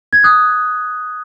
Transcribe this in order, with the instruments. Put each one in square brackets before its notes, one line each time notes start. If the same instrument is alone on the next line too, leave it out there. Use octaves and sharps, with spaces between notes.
[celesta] G#6
D#6 F#6